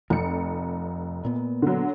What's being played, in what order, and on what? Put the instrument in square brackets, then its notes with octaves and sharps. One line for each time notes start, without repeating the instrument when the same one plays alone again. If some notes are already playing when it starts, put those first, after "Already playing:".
[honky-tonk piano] F1 C#7 [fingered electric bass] F2
[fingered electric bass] A#2 B3
[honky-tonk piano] D3 F#3